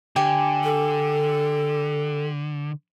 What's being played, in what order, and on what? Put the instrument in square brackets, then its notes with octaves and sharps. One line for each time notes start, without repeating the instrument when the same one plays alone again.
[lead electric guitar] D3 [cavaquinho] G4 G#5
[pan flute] A4